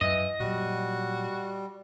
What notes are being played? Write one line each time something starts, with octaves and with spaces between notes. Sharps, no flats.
F#2 E3 D#5
A#2 F#3 G3 F#4